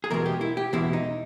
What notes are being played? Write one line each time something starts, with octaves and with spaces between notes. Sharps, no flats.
G#4
E2 B2 G#3 A#4
G4
E4
G4
E2 B2 G#3 E4
D#4